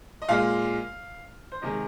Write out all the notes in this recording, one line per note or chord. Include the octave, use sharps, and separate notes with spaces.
D#5
A#2 G#3 F5
C5
C3 D#3 G#3 D#5